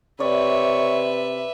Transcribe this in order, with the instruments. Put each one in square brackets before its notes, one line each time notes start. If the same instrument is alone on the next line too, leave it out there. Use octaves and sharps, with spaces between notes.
[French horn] C3 [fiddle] B4 E5 [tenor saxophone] C#5 [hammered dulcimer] D5